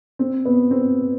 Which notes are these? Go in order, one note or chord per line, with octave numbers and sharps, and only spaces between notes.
C4
B3
C4